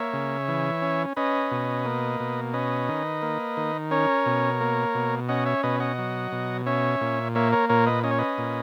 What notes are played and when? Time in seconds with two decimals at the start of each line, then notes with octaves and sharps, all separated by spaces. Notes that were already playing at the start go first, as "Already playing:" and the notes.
Already playing: A#3 C#5 E5
0.13 C#3
0.48 E3
0.82 C#4
1.17 C#4 B4 D#5
1.51 B2
1.85 A#3
2.20 B2
2.54 C#4 B4 D#5
2.89 D#3
3.22 A#3
3.57 D#3
3.91 C#4 A#4 C#5
4.26 B2
4.61 A#3
4.95 B2
5.29 C#4 D#5 F#5
5.46 C#5 E5
5.63 B2 B4 D#5
5.80 D#5 F#5
5.98 F#3
6.32 B2
6.66 C#4 C#5 E5
7.01 A#2
7.35 A#3 C#5 E5
7.52 A#4 C#5
7.69 A#2 A#4 C#5
7.86 B4 D#5
8.03 C#4 D#5
8.11 C#5
8.18 B4 D#5
8.38 A#2